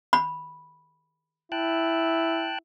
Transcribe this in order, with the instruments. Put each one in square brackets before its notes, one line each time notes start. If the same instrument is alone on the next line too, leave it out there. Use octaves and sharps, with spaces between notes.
[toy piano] B5
[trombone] E4 [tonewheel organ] G5 A5 F#6